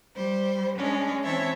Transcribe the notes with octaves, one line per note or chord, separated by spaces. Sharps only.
G3 C5
G#3 C#4 D4
E3 C4 C#5 E5 A5